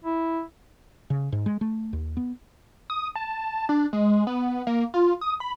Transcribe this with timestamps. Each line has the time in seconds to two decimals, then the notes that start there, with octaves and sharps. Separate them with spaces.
0.04 E4
1.10 C#3
1.32 G#2
1.46 G#3
1.61 A3
1.93 D#2
2.17 B3
2.90 D#6
3.16 A5
3.69 D4
3.93 G#3
4.27 B3
4.67 A#3
4.94 F4
5.21 D#6
5.40 B5